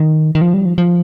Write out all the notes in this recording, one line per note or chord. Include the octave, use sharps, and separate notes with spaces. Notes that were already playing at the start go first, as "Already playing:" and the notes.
Already playing: D#3
D#3
F3
G3
F3
F3